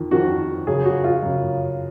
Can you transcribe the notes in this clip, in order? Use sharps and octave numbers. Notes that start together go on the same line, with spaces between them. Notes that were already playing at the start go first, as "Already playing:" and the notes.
Already playing: F2 D#3
F2 D#3 F#4
F#2 C#3 G#4
F#4
F4
F#2 C#3